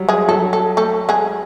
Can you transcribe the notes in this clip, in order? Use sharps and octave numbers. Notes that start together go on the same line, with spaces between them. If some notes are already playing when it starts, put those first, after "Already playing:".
Already playing: F#3 G3
G#3 G#4
F#3 A4
A4
A3 A4
G#3 G#4